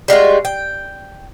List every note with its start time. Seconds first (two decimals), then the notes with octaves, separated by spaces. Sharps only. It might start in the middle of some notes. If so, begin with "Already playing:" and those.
0.08 G3 G#3 F4 F#4
0.45 G5